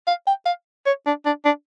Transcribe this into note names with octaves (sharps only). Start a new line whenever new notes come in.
F5
G5
F5
C#5
D4
D4
D4